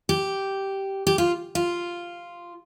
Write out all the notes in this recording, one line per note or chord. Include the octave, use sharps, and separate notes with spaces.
G4
G4
F4
F4